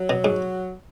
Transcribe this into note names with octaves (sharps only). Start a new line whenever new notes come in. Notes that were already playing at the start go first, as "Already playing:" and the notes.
Already playing: F#3
B2
G#2